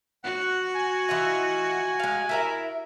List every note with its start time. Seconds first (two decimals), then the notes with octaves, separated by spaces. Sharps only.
0.24 F#4 F#5
0.75 G#5
1.09 E3 F4 D#5
2.00 G#3 F5
2.29 E4 A#4 E5